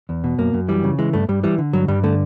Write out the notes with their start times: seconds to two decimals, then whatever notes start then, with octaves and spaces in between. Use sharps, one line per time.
0.09 E2
0.24 B2
0.38 F#2 A#3
0.54 F#2
0.68 E3 G3
0.84 C#3
0.99 E3 G#3
1.13 G2 A3
1.29 G2 G3
1.43 E3 G3
1.58 D3
1.73 G2 F#3
1.88 G2 G3
2.03 D3 A3